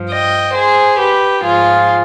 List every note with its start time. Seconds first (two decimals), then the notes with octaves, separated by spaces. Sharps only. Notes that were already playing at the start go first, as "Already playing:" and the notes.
Already playing: G2 F3
0.09 D#5 G5
0.53 G#4 C5
0.98 G4 B4
1.42 G#2 F3 F4 G#4